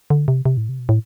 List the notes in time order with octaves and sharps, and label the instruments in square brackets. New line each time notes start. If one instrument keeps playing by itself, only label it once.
[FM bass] D3
C3
C3
A2
C3
B2
A2